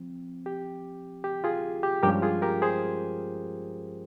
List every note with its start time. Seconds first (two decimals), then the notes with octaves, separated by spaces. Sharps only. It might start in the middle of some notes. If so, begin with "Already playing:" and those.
Already playing: F3 C4
0.46 G4
1.24 G4
1.44 F4 G#4
1.83 G4
2.03 G2 F3 G#3 C#4 G4 A#4
2.22 F4 G#4
2.42 G4 A#4
2.62 G#4 C5